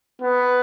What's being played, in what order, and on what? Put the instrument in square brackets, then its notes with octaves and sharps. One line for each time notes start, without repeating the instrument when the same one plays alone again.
[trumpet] B3